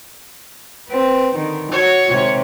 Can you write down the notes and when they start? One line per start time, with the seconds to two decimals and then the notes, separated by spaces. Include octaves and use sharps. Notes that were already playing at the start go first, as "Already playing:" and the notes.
0.88 C4 B4
1.35 D3 D#3
1.72 F#4 C#5
2.09 C3 D#3 G#3